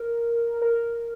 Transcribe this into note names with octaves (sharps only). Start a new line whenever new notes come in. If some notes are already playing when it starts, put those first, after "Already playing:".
Already playing: A#4
A#4